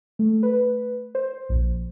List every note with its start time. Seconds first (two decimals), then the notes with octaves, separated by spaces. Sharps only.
0.19 A3
0.43 B4
1.15 C5
1.49 A#1